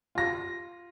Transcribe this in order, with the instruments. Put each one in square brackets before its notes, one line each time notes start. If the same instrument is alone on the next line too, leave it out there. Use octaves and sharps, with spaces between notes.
[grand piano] F4 A#6